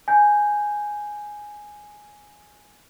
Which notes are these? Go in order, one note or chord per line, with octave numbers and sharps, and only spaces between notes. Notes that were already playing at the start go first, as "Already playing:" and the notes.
G#5 G6